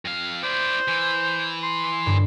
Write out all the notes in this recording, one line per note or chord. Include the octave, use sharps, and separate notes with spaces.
F2 F5
E4 C5 D5
E3
C6
G2 D3